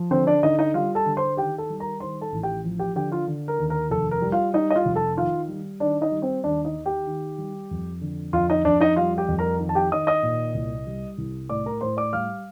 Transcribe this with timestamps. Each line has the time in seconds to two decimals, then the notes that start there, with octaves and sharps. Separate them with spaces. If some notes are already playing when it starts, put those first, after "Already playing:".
Already playing: F3
0.11 D3 C4 C5
0.27 D4 D5
0.43 D3 D#4 D#5
0.59 D#4 D#5
0.74 G3 F4 F5
0.95 A4 A5
1.06 D3
1.17 C5 C6
1.37 D#3 G4 G5
1.58 A4 A5
1.70 G3
1.80 A#4 A#5
2.00 D#3 C5 C6
2.21 A4 A5
2.32 A1
2.43 G4 G5
2.64 F3
2.79 G4 G5
2.96 D3 G4 G5
3.12 F4 F5
3.27 D3
3.48 A#4
3.59 D#2
3.70 A#4
3.91 F1 A4
4.11 A#4
4.22 G3
4.32 F4 F5
4.54 G3 D#4 D#5
4.71 D#5
4.76 F4 F5
4.86 F1
4.96 A4 A5
5.17 D#3 F4 F5
5.49 G3
5.80 D#3 D4 D5
6.01 D#4 D#5
6.12 G3
6.22 C4 C5
6.44 D#2 D4 D5
6.65 D#4 D#5
6.75 D#3
6.86 G4 G5
7.07 D#3
7.38 G3
7.71 F2
8.01 D3
8.33 F2 F4 F5
8.49 D#4 D#5
8.65 F2 D4 D5
8.80 D#4 D#5
8.96 G3 F4 F5
9.18 G4 G5
9.28 F2
9.39 A#4 A#5
9.59 D#3
9.69 A5
9.75 G4 G5
9.92 D#3 D#5 D#6
10.07 D#5 D#6
10.23 A#2
10.54 C2
10.87 G3
11.18 C2
11.49 A2 D5 D6
11.66 A#4 A#5
11.81 A2 C5 C6
11.97 D5 D6
12.13 G3 F5 F6